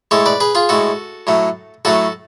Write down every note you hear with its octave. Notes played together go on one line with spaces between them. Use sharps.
A2 G#3 A4 C#5
B4 D5
G#4 B4
F4 G#4
A2 G#3 F#4 A4
A2 F#3 A3
A2 F#3 A3 F#4 A4